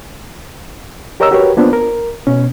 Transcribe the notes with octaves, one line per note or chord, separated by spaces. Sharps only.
G4 A#4 C#5 D#5 A#5 E6
F#4 G4 A#4 B4 C#5
A#3 B3 D4 F4 C5
A#4
B2 C#4